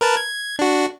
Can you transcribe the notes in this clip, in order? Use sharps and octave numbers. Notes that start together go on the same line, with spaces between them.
A#4 B4 A5
G#6
D4 F#4